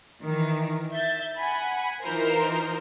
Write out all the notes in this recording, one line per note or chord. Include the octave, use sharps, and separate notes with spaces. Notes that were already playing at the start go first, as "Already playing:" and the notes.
D#3 E3
E5 G6 A6
F#5 G#5 B5
E3 D#4 F4 A#4 C5